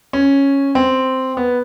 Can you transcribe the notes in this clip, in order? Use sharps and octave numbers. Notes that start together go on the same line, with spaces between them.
C#4
C4
B3